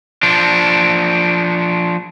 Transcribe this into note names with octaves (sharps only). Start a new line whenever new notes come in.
F3 D4